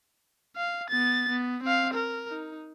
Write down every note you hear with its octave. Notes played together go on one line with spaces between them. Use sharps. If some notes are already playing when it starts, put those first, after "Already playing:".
F5
B3 A6
B3
C4 F5
A#4
D#4